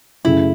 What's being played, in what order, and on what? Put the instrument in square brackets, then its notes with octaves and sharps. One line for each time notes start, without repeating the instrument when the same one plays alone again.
[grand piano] F#2 C#3 A3 [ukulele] E4